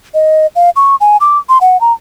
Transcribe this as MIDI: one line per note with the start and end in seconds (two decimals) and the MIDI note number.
0.14 0.47 75
0.55 0.70 77
0.76 0.95 85
1.00 1.17 80
1.21 1.38 86
1.49 1.58 84
1.61 1.80 78
1.81 1.92 82